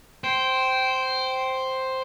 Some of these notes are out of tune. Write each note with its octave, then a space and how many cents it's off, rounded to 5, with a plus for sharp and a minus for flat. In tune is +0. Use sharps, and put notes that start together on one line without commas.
C5 +0 G5 -20